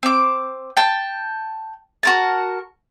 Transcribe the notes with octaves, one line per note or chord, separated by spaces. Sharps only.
C4 D6
G5 A5
F#4 A#4 A5